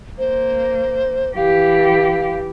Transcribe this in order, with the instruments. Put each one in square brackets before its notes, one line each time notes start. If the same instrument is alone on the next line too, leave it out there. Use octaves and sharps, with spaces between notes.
[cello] A#3 [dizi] C5
[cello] E3 G4 [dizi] F5